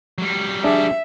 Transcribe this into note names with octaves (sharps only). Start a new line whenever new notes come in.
F#3 G3
D4 G#4 D5 E5